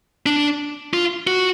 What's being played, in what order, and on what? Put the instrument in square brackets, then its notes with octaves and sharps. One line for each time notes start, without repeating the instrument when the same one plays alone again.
[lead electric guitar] D4
F4
F#4